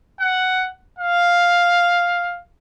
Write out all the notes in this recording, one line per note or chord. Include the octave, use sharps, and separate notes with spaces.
F#5
F5